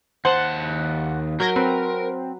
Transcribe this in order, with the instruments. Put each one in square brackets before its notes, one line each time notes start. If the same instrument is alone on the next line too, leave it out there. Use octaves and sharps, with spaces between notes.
[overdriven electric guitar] D#2 A5 [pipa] C5 [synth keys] F#5
[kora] F#3 [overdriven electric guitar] A#4 [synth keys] G6 G#6 A#6
[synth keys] C4 [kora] B4